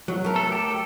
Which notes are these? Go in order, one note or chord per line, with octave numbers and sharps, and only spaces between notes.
F#3
A3 A#4
A4
G4 A4